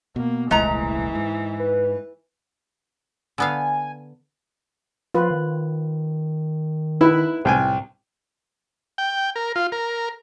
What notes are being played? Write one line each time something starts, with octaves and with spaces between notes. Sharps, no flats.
B2 A#3
D#1 C2 A2 E3 G#3 A#5
G#2
B4
D3 B3 F5 G#5
F3 F4 B4
D#3
D#4 E4 B4 E5
C2 A2 G5 G#5
G5
A#4
F4
A#4